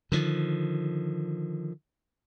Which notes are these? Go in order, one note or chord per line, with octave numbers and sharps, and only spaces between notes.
D3 D#3 F3